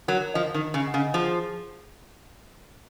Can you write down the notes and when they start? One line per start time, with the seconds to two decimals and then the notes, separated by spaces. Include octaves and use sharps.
0.08 F#3 A#4
0.34 F3 D#5
0.54 D#3
0.62 D#5
0.74 C#3
0.88 F#5
0.94 C#3
1.14 F3 G#4